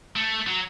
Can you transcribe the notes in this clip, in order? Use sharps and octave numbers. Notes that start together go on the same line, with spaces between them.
A3
F#3